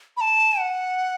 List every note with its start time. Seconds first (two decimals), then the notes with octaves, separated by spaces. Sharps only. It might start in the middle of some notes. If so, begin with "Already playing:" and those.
0.17 B5
0.21 A5
0.59 F#5